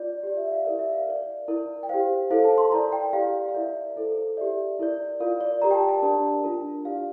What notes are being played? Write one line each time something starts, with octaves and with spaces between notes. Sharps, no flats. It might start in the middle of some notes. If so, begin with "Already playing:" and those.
Already playing: F4 D5
G4 D5
E5
E5
F5
E4 G4 A#4 D5
E5
F5
E4 A#4 D5
E4 A#4 D5
G5
G4 C5 F5
E4 A4 C5 F5
A5
C6
E4 A#4 D5 A#5
G5
G4 D5 F5
F5
E4 A#4 D5 E5
E4 A4 C5
G4 D5 E5
E4 A#4 D5
F4 A#4 D5 F5
D5
G4 A#4 D5 A#5
G5
A5
A5
D4 G4 A#4 D5
D4 F4 A#4
E4 G4 D5 F5